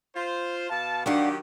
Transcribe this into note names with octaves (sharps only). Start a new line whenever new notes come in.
F4 C5
B2 F5 A5
D#3 F#3 D4 G4 F5 F#5